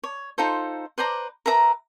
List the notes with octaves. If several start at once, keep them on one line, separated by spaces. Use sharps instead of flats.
C#5
D#4 F4 A4 C5
B4 C5 D5 A#5
A#4 B4 E5 A#5